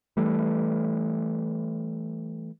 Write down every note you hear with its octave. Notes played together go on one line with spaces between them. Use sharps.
E3 G3 A3